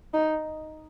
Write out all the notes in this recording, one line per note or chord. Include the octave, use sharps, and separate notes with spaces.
D#4